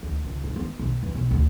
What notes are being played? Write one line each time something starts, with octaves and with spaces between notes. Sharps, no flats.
D2
C#2
G1
B3
B1
E3
B1
D2